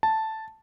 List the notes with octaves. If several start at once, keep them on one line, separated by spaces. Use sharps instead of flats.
A5